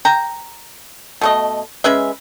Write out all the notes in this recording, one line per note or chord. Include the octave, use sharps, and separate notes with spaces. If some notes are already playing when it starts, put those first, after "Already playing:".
G5 A#5
B2 A3 D#5
G#3 C#4 B4 E5